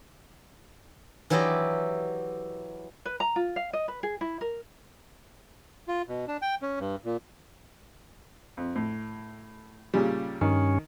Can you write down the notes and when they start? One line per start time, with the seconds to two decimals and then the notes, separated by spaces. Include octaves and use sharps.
1.30 E3 F#3 E4 G4 D5 D#5
3.05 B4
3.20 A#5
3.36 F4
3.56 F5
3.73 D#5
3.88 B4
4.03 G#4
4.21 E4
4.41 A#4
5.88 F4
6.09 B2
6.28 D4
6.42 G5
6.62 C#4
6.80 G2
7.05 A#2
8.57 F2
8.75 A2
9.94 A#2 C#3 G3
10.41 G2 D#3 C#4